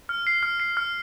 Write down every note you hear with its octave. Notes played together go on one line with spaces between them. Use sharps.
F6
C7
F6
C7
F6